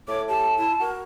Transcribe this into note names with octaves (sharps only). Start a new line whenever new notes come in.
A2 C#5 D6
G4 A5
E4
F#4 A#4